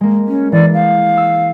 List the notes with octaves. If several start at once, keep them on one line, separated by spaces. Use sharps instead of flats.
G#3 A#3
C#4
E3 D5
F5
E6